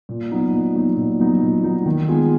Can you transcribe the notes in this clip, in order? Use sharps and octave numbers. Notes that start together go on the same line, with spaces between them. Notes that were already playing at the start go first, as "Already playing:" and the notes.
A#2
F#3 B3 D#4
A#2
F#3 B3 D#4
A#2
F#3 B3 D#4
A#2
F#3 B3 D#4
D#3
G#3 B3 F4 G#4